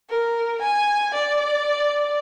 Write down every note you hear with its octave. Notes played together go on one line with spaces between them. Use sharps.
A#4
G#5
D5